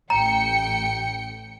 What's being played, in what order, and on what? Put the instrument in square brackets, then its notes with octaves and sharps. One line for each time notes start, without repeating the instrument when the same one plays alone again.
[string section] A1 G5 C#7 [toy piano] A#5